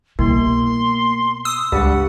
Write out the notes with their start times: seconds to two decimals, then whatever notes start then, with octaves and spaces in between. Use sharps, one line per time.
0.19 C2 B2 A#3 C6
1.45 D#6 E6
1.72 C#2 G2 G4 F#5